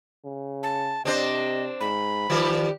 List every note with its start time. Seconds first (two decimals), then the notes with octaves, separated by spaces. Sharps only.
0.24 C#3
0.63 A5
1.05 C3 C4 D4 C5 D#5
1.80 G#2 B5
2.30 D#3 F3 G3 G4